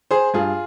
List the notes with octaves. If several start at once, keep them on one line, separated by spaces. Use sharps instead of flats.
G#4 C5
G2 F4 G#4